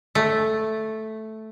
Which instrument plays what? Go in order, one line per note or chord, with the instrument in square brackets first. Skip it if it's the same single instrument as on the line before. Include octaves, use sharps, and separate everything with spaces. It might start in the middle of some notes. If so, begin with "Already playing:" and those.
[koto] A3